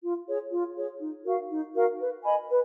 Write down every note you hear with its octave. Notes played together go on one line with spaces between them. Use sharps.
F4
G#4 C#5
F4
G#4 C#5
D#4
F#4 A#4 F5
D#4
F#4 A#4 F5
B4
D#5 G#5 B5
B4